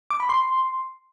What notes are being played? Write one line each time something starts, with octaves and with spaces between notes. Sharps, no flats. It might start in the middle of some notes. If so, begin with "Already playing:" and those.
D6
B5
C6